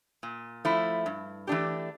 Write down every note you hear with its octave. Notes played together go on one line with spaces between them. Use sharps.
A#2
F3 A3 E4
G2
E3 A3 D4 G4